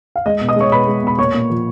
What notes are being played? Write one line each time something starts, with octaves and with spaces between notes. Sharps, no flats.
F5
G#3 D#5
B2
D#5 D#6
G#3 C#5 C#6
B2 B4 B5
G#3
B2 B5
A#2 C#5 C#6
A#2
F3